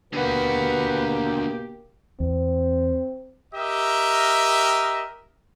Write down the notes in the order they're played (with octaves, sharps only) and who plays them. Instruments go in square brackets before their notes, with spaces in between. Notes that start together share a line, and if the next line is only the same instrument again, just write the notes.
[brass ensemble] B2 A#3 G4 [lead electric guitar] D3 F#4 [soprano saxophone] B4
[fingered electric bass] E2 [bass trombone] C4
[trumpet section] G4 A#4 D#5 E5